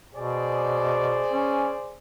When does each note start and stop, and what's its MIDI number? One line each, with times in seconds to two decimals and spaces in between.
0.15 1.22 47
0.15 1.98 68
0.15 1.98 72
0.15 1.98 74
1.32 1.72 61